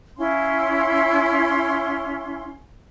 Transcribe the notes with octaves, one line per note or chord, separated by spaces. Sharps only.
C#4 E4 F5 C6